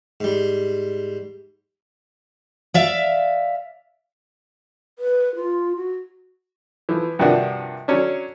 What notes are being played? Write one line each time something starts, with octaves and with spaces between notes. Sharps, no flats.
G#2 G3
D5 E5 F5
B4
F4
F#4
E3 F3
G2 C3 D#3 F3 D4 F#4
F#3 C#4 D4